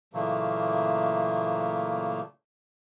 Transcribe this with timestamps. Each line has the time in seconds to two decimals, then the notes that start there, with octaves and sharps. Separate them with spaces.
0.14 A#2 C#3 E3 F#3 A3 A#3